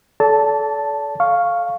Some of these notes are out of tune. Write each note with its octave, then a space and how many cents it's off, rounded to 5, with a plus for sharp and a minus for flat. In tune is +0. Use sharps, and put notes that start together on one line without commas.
A4 -25 D5 -40 A5 +0
F5 +0 C#6 +0